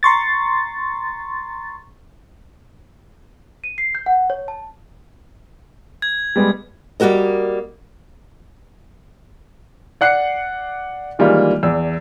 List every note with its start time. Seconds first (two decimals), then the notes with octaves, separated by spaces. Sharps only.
0.03 A#5 C6 C#6 A6
3.64 D#7
3.78 C7
3.95 G6
4.06 F#5
4.30 C#5
4.48 A5
6.02 G#6
6.36 G3 G#3 B3
7.00 G3 A#3 F#4 A#4 D#5
10.01 D5 F#5 F#6 C7 C#7
11.19 D#3 E3 G3 G#3 A#3 F4
11.63 E2 D5 E6